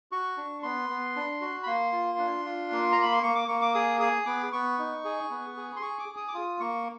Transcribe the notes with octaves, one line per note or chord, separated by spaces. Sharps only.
F#4 C#6
D4
B3 C6
B3
D4
F#4
B5
A#3 C6
F4
D4
F4
A#3
A#3 A#5
B5
C6
A#3 C#6
D6
A#3 C#6
D6
G#4 D#6
G#4 D#6
B3 D6
B3 C#6
D#4
G#4
B3
G#4
C6
G#4 C#6
D6
G#4
D#6
D6
F4 D#6
A#3 C#6